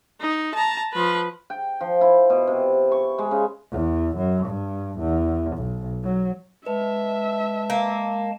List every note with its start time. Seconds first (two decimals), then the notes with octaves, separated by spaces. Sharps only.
0.21 D#4
0.55 A5 A#5
0.93 F3 B4
1.50 G5
1.81 F3
2.01 E4
2.30 B2
2.47 C3
2.92 C#6
3.18 G#3
3.31 C#3
3.72 E2
4.17 F#2
4.46 G2
4.99 E2
5.57 B1
6.04 F#3
6.66 G#3 B4 E5 A5
7.70 A#3